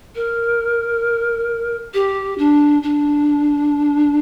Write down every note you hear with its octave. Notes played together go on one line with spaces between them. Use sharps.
A#4
G4
D4
D4